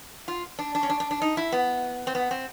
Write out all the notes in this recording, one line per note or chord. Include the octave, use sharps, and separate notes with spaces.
F4
D4
D4
C#4
D4
D4
D4
D#4
E4
B3
C4
B3
C4